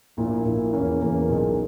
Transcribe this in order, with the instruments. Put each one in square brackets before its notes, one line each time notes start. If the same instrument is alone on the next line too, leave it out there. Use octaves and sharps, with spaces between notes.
[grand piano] A#1 A#2 A#3 E4
A#1 A#2 A#3 E4
E2 C#3 E3 A#3 C#4
E2 C#3 E3 A#3 C#4
B1 A#2 A#3 D#4 G#4